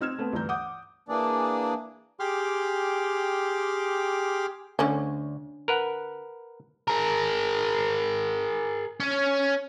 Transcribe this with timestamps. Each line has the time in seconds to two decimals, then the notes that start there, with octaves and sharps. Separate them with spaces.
0.01 C4 D#4 E6 F6 G#6 E7
0.19 A3 B3 C4
0.33 D2 G2 E3 A#5 G6
0.49 F#5 D6 D#6 G6
1.09 E3 A#3 D4 G#4 D5
2.20 G4 G#4 G5 C6 D6 F6
4.79 D2 D3 C#4
5.68 A#4 B4 F#5
6.88 G#4 A#4
9.00 C#4